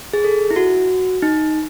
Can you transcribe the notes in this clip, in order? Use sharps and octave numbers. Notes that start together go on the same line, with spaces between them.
G#4
A4
E4
F#4
D#4